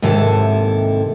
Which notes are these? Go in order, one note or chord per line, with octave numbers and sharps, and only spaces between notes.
D#2 G#2 C3 E4 A4